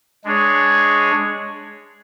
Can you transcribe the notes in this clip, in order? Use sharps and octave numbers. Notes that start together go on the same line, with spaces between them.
G#3 D4 G#4 C#5